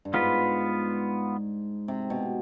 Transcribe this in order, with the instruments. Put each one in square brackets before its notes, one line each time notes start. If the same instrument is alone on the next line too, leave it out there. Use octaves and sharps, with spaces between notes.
[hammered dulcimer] G2
[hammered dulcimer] G#2 [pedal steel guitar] B3 F4 B4
[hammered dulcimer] C3
B2